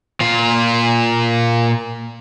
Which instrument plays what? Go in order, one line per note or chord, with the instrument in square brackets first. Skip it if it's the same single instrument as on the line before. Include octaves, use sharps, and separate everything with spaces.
[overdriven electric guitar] A#2 F4